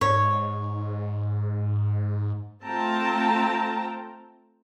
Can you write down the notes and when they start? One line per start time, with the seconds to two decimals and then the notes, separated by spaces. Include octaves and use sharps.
0.01 G#2 C#5
2.64 A3 C4 F4 G5 A5 A#5